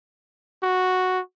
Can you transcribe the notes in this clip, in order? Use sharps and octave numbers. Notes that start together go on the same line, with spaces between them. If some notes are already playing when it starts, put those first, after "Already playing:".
F#4